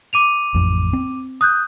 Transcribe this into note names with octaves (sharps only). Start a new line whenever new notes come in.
D6 D#7 F7
A1 F2
C4
D#6 F#6 G6